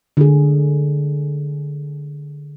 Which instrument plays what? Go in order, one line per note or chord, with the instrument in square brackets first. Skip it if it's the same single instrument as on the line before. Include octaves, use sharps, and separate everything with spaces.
[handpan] D3 G#4